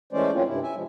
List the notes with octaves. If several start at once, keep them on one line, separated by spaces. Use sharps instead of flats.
E3 G#3 A3 C#4 C5 D5
F#3 A#3 C4 C#4 F4
G2 C3 E4
E5 G#5
C3 F3 G#3